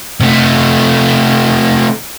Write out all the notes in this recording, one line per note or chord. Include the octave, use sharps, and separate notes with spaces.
C3 A3